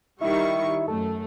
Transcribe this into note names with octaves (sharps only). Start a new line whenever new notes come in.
D#3 G3 E4 C#6
F#2 A3 A4